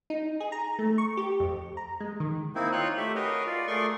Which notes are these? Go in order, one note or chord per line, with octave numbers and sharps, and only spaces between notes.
D#4
G#4
A#5
A3
C#6
G4
F2
A#5
G#3
D#3
A#3 C4 D#4 E4
D#4 F4 C#5 F#6
A3 G4 E5
F#4 G#4 A#4 B4 C#5 D#5
F4 D5
A3 G#4 A#4 D5 C6 C#6